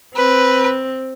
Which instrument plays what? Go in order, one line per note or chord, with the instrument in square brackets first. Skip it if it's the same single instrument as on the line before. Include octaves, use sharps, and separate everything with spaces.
[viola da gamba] C4 [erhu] B4